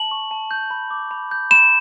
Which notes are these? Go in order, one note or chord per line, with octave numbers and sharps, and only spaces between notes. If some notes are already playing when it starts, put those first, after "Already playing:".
Already playing: A5 F#7
C#6
A5
G6
B5
D6
B5
G6
B5 E7